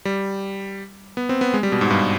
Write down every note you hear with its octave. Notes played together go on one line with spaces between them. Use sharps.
G3
B3
C4
B3
G#3
G3
B2
G#2
G2